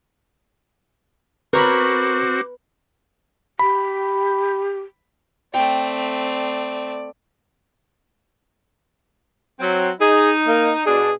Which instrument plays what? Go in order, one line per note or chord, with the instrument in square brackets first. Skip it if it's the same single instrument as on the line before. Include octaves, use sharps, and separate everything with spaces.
[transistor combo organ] C4 F#4 [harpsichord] A#4 C#5 B5 [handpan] B4 [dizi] D6
[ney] G4 [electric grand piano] B5
[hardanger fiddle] A3 C4 [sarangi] D5 [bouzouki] G5
[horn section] F#3 C4
[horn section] D#4 [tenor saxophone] G#4
[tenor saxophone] A#3
[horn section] B2 D4 [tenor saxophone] G#4